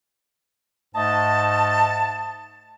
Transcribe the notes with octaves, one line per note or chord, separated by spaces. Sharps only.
G#2 A3 D#5 A5